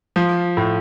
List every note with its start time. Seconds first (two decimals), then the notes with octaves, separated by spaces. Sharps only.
0.16 F3
0.57 A2